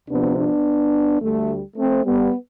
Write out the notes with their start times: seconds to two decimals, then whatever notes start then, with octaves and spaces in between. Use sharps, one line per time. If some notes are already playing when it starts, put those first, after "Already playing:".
0.09 D2 C3 F3 B3 D4
0.37 B3 D4
1.21 D2 D3 G3 A3
1.77 A3 C4
2.05 G3 B3